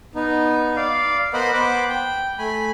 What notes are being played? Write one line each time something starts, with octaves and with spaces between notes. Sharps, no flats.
B3 D#4
D5 F5
B3 A#4 C5 D#5 F#5 B5
B3 C5 F#5 B5 D6
G5
A3 G#5 B5